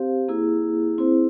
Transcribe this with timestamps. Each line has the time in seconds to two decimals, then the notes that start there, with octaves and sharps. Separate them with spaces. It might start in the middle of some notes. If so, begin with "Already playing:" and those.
Already playing: C4 G4 C5 F5
0.28 A#3 E4 G#4
0.98 C4 E4 G#4 C5